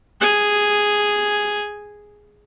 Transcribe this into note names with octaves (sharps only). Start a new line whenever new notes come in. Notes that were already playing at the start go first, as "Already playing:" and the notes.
G#4 G#5